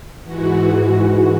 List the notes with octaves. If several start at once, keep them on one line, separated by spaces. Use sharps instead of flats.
G#2 E3 F#4